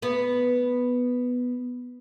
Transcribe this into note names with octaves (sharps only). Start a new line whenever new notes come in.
B3 B4